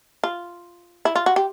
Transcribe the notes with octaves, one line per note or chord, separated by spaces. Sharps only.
F4
E4
F4
F#4
G4